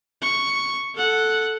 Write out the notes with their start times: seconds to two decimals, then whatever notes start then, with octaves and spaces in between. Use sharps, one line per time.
0.22 C#6
0.96 A4 F#5